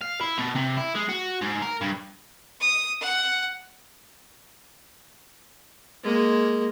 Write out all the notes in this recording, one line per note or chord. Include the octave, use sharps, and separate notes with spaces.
F5
E4
B2
C3
E4
G#3
F#4
G#2
A#4
G2
D#6
F#5
G#3 A#3